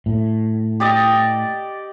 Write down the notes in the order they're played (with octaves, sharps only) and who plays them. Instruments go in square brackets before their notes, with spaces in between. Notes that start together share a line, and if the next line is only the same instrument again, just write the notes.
[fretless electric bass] A2
[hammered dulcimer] G4 D5 D#5